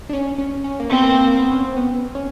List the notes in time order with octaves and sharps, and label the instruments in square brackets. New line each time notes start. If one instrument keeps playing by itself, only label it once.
[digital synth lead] D4
C#4
C#4
C#4
A#3
[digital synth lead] B3 [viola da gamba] C4
[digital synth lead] A#3
A#3
A#3
B3
C#4
C4
B3
C#4